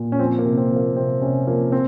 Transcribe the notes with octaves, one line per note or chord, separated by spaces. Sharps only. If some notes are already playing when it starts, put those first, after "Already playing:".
Already playing: A#2
C#4
F3 C4
A#3
C3
C4
F3
A#3
C3 C4
C3 C#4
F3 A#3
C4